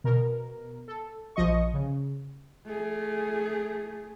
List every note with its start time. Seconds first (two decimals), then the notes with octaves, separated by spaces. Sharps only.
0.04 B2 A#4
0.88 A4
1.36 A#1 F3 D#5 C#6
1.74 C#3
2.66 A3 G#4